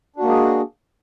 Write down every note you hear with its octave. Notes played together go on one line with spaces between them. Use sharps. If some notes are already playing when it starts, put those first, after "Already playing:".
G#3 A#3 D4 F#4 G#4